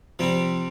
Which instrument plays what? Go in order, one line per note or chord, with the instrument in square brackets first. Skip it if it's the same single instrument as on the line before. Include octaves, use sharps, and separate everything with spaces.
[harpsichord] C3 G3 C4 [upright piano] F3